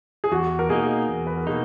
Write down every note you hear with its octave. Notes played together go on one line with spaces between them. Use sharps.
G#4
E2 F#4
A#4
B2 A#3 D#4 G#4
E2
B4
A#4
B2 A#3 D#4 G#4